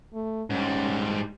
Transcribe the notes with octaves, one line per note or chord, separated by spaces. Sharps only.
A3
G#2 G3 C#4